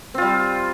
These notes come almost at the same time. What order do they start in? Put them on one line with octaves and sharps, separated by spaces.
C4 F4 G3